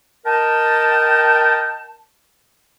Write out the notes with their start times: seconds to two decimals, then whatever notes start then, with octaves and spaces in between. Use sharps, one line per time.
0.26 A#4 D#5 G5 A5